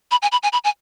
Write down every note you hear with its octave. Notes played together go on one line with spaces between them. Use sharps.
B5
G#5
B5
G#5
B5
G#5